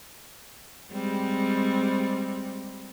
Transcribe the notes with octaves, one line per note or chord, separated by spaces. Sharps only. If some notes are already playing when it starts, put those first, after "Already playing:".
G3 G#3 C4